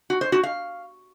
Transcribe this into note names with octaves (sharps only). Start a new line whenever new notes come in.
F#4
C5
F#4
F5